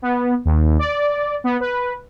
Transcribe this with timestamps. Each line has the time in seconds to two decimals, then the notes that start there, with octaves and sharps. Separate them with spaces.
0.02 B3
0.45 D#2
0.79 D5
1.44 B3
1.60 B4